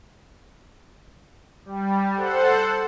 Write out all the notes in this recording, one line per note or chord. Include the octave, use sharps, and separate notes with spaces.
G3
A4 C5 F#5